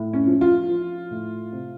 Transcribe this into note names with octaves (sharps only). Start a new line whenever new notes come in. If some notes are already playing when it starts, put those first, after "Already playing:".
Already playing: A2
C#4
F3
F4
F3
A2
C3